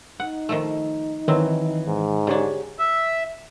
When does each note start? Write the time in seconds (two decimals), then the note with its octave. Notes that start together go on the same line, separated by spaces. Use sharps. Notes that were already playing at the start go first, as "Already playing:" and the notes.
0.20 D#4 F#5
0.49 D#3 F3 A3
1.28 D#3 E3 F#3 C4
1.86 G#2
2.27 D3 D4 G4 G#4 C#5
2.79 E5